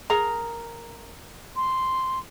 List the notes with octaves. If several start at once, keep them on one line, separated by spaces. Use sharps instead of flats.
G#4 A#4 A#5
C6